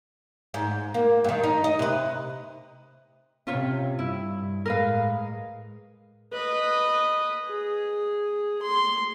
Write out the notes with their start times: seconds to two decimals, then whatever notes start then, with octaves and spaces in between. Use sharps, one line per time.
0.54 G#2
0.94 A#3
1.24 G2 D#3
1.44 D#4
1.64 D#5
1.79 C3 B4
3.47 C3 C#4 F4 C#5
3.99 G2 E4
4.66 A2 G#3 A#4 B4 F5
6.33 B4 D#5
7.48 G#4
8.62 C6